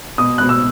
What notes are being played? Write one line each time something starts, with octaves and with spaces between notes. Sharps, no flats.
B2 D#6
B2 F#6
E6